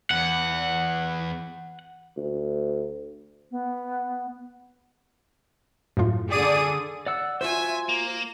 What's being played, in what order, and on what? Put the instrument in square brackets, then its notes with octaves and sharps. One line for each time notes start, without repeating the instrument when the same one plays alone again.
[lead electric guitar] E2 [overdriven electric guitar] F#5
[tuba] D2
[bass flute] B3
[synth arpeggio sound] F#2 A2 F4
[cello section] D3 G#4 [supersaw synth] D5 D#6 D#7
[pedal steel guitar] D5 F#5 E6
[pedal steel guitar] F4 F#4 C5 [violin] E5 G#5
[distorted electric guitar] A#3 [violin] A#5